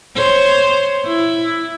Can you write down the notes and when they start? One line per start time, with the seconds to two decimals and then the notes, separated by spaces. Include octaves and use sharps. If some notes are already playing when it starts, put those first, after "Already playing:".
0.16 C5 C#5
1.06 E4